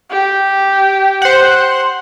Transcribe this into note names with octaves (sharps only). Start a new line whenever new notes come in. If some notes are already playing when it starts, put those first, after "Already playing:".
G4
C5 F#5